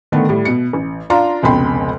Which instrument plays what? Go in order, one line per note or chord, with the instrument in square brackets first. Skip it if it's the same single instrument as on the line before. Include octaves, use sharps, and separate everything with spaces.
[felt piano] D3 D#3 A3 B3
A2 G3
B2 C#7
A1
D4 F4 F5 A#5 C6
F1 C#2 B2 G5 B5 C6